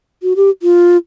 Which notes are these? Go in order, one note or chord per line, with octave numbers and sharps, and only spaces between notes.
F#4
G4
F4